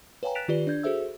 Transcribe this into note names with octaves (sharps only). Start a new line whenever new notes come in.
B4 C#5 F5 G5 G#5 A#5
F#6 A6 B6 D7 E7 F7
D#3 F4 G4 B4 D5 G7
D4 D5 G6 G#6
F#4 G#4 A4 C5 E5 E6